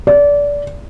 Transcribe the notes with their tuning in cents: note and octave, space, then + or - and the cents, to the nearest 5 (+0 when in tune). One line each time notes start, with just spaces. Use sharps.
D5 -25